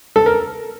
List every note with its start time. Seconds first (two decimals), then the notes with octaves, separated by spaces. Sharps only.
0.16 A4
0.26 A#4